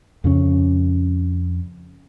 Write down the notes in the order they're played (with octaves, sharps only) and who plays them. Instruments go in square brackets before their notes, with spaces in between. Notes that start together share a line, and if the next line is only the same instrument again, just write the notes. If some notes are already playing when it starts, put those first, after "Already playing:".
[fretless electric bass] F2 C#3 C#4